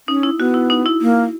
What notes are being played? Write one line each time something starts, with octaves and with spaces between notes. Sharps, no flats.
C#4 D#4
E4
B3 F#4
E4
D#4
E4
A#3